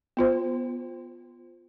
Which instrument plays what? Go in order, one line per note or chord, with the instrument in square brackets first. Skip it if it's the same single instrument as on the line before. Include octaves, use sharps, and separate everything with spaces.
[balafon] B3 F4 C5